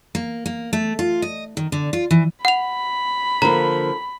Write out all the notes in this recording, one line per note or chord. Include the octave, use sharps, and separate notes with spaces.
A#3
A#3
A3
F4
D#5
D#3
D3
F4
E3
F#5 B5 F7
D3 F3 A#3 A#5